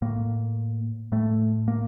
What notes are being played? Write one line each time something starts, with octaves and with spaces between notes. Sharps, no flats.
A2 A#3
A2 A3
A#3